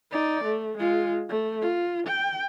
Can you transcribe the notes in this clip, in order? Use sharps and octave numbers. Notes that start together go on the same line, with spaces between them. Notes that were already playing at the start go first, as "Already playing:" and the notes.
D#4 D5
A3
G#3 F4
A3
F4
G5